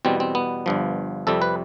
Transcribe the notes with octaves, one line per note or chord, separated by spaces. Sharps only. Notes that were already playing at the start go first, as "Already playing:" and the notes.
E2 B2 G3 C4
C4
B3
G1 G2 F3
F2 C3 G3 A4
B4